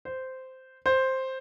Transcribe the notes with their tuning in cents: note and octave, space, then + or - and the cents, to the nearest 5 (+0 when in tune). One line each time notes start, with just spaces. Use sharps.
C5 -10
C5 +5